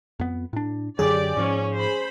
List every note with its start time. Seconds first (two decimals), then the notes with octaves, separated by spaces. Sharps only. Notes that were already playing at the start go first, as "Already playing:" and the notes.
0.20 F2 B3
0.53 A2 D4
0.99 F#2 D3 F#3 G4 G#4 D5 G#5
1.37 G#2 F3 C#4
1.74 C5 B5